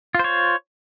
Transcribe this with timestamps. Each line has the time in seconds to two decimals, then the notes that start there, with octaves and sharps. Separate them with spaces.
0.15 F4
0.19 C5
0.24 C#5